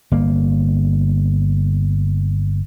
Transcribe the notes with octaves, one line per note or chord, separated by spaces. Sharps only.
G1 A#3